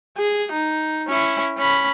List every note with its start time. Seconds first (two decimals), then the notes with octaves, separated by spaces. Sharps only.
0.18 G#4
0.53 D#4
1.08 C#4 E4
1.58 C#4 B5